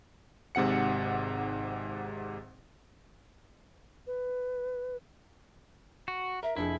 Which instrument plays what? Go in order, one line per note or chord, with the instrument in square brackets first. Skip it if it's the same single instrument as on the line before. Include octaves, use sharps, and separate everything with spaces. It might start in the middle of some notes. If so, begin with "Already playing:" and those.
[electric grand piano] G#1 G#2 C3 F#5 C#7
[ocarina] B4
[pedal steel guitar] F#4
[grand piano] A#4 [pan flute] E5
[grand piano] F1 F2 G#4 [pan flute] D4 [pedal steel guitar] E4